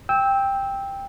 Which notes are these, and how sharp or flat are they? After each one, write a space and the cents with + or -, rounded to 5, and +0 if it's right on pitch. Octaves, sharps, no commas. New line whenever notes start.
G5 +10 E6 -15